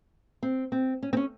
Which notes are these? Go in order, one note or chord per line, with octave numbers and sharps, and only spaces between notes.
C4
C4
C#4
C4
C#4